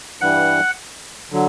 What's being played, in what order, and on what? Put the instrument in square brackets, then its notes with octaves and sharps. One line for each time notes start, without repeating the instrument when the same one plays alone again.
[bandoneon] G2 E3 G3 [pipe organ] F#5
[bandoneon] D3 F#3